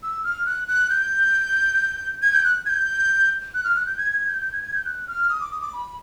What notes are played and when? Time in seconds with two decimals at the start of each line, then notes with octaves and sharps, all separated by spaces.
0.03 E6
0.24 F6
0.46 F#6
0.68 F#6
0.90 G6
2.22 G#6
2.33 G6
2.44 F#6
2.66 G#6
2.69 G6
3.54 F#6
3.64 F6
3.76 F#6
3.86 G6
3.98 G#6
4.12 G#6
4.27 G6
4.42 G6
4.53 G#6
4.63 G#6
4.74 G6
4.85 F#6
5.08 F6
5.30 D#6
5.41 D6
5.51 D#6
5.62 D6
5.73 B5